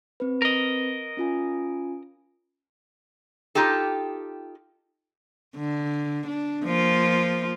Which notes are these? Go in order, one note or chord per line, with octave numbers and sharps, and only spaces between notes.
C4 B4
A#4 D#5
C#4 F4 G#5
D#4 F4 G4 A4
D3
D4
F3 A#3 F4